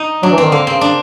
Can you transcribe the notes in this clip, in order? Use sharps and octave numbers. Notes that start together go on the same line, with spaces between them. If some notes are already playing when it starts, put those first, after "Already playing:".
Already playing: D#4
F#3 D4
E3
D#3 C4
D3 A#3
C#3 C4
D4